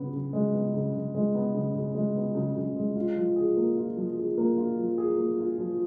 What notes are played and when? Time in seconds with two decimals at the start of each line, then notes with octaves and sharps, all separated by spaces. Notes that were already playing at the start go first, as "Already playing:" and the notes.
Already playing: C#3 B3
0.13 C#3
0.33 G#3
0.53 B3
0.74 C#3
0.94 C#3
1.15 G#3
1.35 B3
1.54 C#3
1.75 C#3
1.95 G#3
2.15 B3
2.35 C#3
2.55 C#3
2.76 G#3
2.96 F4
3.16 F3
3.36 G#4
3.56 A#3
3.77 F4
3.97 F3
4.17 G#4
4.38 A#3
4.58 F4
4.78 F3
4.98 G#4
5.18 A#3
5.38 F4
5.58 F3